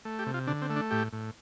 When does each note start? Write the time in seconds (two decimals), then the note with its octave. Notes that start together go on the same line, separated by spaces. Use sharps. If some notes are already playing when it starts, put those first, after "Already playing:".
0.05 A3
0.19 G4
0.27 C3
0.34 F4
0.47 D3 D4
0.62 C4
0.70 A3
0.76 D4
0.91 A2 G4
1.13 A2